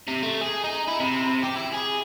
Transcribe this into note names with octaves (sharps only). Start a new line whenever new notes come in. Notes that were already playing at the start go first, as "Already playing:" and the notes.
C3
A3
G#4
D#4
E4
C3
G4
E4
G#4